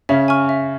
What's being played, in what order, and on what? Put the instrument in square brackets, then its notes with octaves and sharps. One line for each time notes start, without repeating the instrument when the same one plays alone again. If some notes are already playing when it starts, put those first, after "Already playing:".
[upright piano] C#3 C#4 [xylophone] E5
[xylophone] G#5 C#6 F6
E5